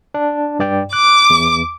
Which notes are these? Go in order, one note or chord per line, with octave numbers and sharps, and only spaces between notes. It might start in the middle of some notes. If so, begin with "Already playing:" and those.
D4
G2 D5 G5
D6 F#6
E2